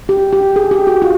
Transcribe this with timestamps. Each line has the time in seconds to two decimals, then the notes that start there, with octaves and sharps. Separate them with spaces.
0.09 G4
0.33 G4
0.56 G#4
0.71 G4
0.87 F#4
1.02 F4